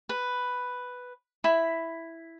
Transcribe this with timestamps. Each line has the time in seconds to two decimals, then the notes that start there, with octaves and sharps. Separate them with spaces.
0.09 B4
1.44 E4 B5